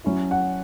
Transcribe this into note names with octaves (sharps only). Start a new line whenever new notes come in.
F#3 C#4 E4
F#5